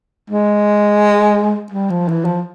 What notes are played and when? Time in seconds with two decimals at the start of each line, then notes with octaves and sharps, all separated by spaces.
0.30 G#3
1.72 G3
1.90 F3
2.08 E3
2.25 F3